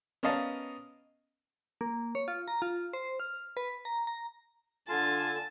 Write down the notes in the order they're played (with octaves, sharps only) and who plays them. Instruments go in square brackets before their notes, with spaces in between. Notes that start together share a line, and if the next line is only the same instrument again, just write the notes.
[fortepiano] B3 C#4 A#4 D#5 F5 A5
[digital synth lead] A#3
C#5
F4
A#5
F4
C5
F6
B4
A#5
A#5
[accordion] D3 [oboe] F4 [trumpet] G#5 [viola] A5